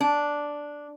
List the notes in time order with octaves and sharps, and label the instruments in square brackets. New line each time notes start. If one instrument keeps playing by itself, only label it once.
[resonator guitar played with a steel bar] D4